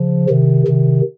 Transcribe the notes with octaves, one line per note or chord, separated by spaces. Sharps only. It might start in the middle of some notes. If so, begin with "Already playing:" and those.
Already playing: C#3 F3
C3 D#3
C3 D#3